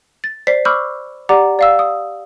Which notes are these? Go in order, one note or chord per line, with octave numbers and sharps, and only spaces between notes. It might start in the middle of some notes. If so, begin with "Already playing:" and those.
A6
C5 D5 B6 C7
B5 C#6 D6 E6 F6 G6
G4 D5 F#5 A#5 D6
D5 F5 E6
D#6